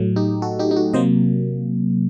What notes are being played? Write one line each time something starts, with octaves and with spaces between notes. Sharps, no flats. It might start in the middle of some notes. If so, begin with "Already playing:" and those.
Already playing: A2 F#3 A3
D#4 G4
F#4 A4
D#4 G4
D#4
F#4
C3 F#3 A#3 C5 D#5